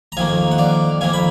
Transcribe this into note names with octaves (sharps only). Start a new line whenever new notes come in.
A#5
F2 D#3 A#3 F5 G#5
F#5
D5 F5
F2 D#3 A#3 F5 G#5
B5